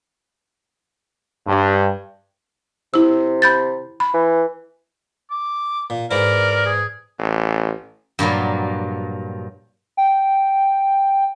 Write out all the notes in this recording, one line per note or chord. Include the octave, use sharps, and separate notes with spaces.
G2
C3 E4 E6
B5 G6 A6
B5
E3
D6
A#2
G#2 E3 E4 A#4 D5
G#4
A1
G2 A#2 F3 F#3
G5